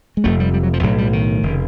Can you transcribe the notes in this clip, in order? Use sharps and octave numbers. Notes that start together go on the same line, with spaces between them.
G#3
F1 F2 C3 A3
G3
G3
F#3
F3
B1 A2 F#3
G3
D#3
F1 C#3